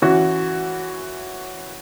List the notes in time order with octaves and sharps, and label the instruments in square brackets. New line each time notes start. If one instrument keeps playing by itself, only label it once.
[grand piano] E3 C#4 F#4